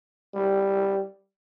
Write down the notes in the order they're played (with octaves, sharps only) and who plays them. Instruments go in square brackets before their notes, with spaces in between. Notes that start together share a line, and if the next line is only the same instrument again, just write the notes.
[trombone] G3